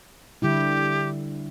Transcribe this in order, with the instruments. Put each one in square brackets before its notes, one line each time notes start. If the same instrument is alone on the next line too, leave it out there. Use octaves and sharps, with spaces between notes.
[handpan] D3 G3 E4 [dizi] G4